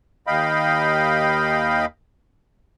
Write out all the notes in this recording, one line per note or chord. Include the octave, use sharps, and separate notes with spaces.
D#2 D#5 F5 G5 B5